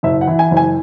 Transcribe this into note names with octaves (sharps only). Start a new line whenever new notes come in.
F#1 E5
F#5
E3
G#5
F#1
G#5